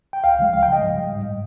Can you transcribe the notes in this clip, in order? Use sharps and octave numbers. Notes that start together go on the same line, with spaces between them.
G5
C#2 F5
C#3 F3 G#3
C#2 F5
G5
C#3 F3 G#3 D#5
G#2
G3
G#2
G3